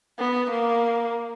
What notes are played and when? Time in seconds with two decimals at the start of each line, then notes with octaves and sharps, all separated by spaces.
0.19 B3
0.51 A#3